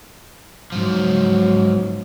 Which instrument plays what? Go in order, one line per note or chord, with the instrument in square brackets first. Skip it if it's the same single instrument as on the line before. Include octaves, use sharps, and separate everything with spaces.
[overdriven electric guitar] G#2 F3 [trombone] F#3